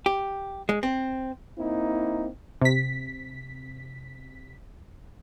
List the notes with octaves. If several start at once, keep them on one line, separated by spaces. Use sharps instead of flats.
G4
G#3
C4
A#3 C4 D#4 E4
C3 B6